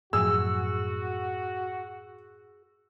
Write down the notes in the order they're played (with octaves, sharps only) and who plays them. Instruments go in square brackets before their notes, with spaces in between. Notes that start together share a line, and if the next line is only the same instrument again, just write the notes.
[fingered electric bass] F#2 A2 F3 [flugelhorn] F#4 [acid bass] G#4 [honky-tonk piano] E6